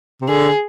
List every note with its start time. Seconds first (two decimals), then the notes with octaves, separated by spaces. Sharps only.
0.21 C3
0.29 D3 G#4